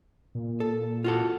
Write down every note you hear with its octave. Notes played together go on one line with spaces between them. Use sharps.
A#2
A4
F4 F#4 A4